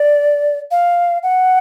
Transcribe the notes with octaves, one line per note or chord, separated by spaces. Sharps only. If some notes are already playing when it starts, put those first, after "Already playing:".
Already playing: D5
F5
F#5